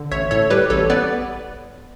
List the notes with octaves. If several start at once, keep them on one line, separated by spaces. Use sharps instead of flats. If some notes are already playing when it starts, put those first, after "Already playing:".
Already playing: D3
A1 C#5 E5
A2 A4 C#5
G3 G4 B4
A1 A4 C#5
B3 B4 D5